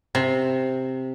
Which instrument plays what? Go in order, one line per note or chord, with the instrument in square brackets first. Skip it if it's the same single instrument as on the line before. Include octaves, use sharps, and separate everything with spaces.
[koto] C3